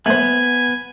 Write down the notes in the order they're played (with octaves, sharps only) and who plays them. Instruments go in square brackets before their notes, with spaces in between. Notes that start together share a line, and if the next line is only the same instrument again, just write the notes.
[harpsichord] A3 C5 [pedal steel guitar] B3 [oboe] G#5